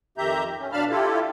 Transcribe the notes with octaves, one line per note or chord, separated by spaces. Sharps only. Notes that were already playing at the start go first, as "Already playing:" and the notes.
F2 D#3 G4 E5 A#5 G6
C#4
B2 D4 F5 A5 B5 F6
E4 F4 G4 A4